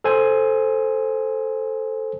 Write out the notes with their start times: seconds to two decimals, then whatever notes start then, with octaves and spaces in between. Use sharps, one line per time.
0.04 A4 C5 G#5